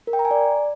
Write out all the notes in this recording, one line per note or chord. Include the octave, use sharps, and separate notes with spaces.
A#4
G5
A#5
G#5
D5